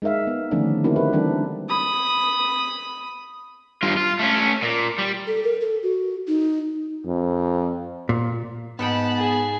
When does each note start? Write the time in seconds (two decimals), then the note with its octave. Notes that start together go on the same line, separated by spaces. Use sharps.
0.02 G#3 D#4 A#4 E5 F5
0.27 B3
0.51 D3 D#3 F3 A3 C#4 D4
0.84 A#3 C4 D#4 E4 F#4
0.96 G4 A#4 B4
1.13 E3 G3 C4 D4 G4 A4
1.69 B5 D#6
3.83 G2 F4
3.97 F4
4.19 A3 C#4
4.63 A#2
4.99 G3
5.27 A4
5.44 A#4
5.61 A4
5.83 F#4
6.27 D#4
7.06 F2
8.09 A#2
8.79 G#2 B3 F#5 G5 A5 B5
9.19 G#4